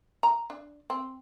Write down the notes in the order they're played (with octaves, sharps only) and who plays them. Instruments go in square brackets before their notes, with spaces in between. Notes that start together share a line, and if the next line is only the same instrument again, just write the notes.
[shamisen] A#5
D4
C4